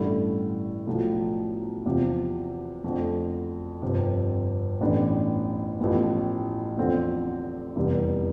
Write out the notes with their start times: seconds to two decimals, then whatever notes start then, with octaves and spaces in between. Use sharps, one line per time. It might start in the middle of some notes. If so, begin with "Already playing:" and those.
Already playing: A1 G2 D3 A3 E4
0.87 B1 A2 F3
1.85 E2 C3 F3
2.84 F2 D3 A3
3.82 G1 F2 C3
4.81 A1 A2 E3 B3 D4
5.80 A1 A2 F3 B3
6.77 E2 D3 F3 C4
7.76 F1 E2 C3 E3 G3